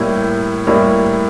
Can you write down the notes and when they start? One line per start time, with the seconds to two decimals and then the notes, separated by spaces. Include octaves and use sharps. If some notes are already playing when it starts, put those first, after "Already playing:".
Already playing: A2 G3 A#3 E4
0.66 A2 G3 A#3 E4